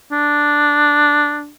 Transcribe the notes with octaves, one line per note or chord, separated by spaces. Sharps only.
D4